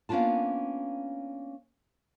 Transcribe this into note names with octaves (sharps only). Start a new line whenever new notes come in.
A#3 B3 C#4 D4 F4 A5